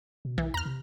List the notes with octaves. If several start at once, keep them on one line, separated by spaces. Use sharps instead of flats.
B2
B1 E3
E2 A#5 F6
C3